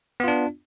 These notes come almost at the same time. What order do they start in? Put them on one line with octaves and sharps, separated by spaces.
B3 F4 D4